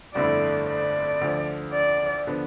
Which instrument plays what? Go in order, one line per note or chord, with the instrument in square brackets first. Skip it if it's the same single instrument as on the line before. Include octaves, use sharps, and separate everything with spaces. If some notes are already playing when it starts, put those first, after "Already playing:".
[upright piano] G1 F2 D3 A3 E4 [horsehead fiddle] D5
[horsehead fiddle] D5
[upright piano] D2 D3 F3
[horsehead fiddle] D5
[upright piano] D3 F3 B3 D4